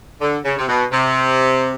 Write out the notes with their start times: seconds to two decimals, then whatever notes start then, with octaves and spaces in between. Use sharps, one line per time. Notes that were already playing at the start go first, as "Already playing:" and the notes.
0.21 D3
0.45 C#3
0.58 C3
0.69 B2
0.92 C3